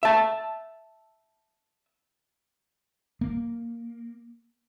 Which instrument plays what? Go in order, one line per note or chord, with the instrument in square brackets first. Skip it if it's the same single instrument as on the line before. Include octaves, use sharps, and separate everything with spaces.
[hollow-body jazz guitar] E5 A5
[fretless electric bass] A#3